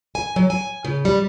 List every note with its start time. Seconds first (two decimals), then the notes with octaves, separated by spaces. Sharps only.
0.15 G#5
0.36 F#3
0.50 G#5
0.85 C#3
1.05 G3